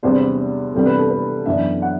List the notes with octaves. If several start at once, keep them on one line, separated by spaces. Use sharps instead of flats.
E2 C3 G3 B3 D4 C5
C3 E3 G3 B3 D4 A4
B4
A4
B4
F#2 E3 B3 D4 E5
F#5